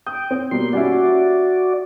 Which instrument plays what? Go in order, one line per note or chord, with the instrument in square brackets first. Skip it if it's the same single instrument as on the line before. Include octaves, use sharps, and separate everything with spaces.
[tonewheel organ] G5 [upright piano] D#6
[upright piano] C4
[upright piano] B2 G3 A#3 [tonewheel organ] C6
[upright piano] G3 C#4 E4 [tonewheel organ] F#4 D5